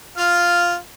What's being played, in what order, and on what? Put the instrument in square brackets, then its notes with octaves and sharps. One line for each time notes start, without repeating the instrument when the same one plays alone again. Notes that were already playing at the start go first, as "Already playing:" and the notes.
[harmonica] F4 F5